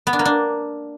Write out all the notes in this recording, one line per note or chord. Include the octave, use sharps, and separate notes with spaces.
B3
D4
A#3
D4